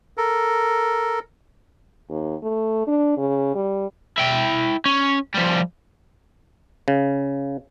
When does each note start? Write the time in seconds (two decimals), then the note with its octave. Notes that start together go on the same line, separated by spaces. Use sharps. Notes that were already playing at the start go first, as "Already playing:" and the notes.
0.17 A4 A#4
2.10 D#2
2.43 A3
2.87 D4
3.17 C#3
3.55 G3
4.18 E4 G5
4.85 C#4
5.35 F3 G3
6.88 C#3